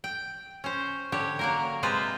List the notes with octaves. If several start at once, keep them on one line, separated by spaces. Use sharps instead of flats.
G5
C#4 C5
D3 G4 C#5
F#3 A#3 A#4
C3 G#3 F4 B4 C5 G#5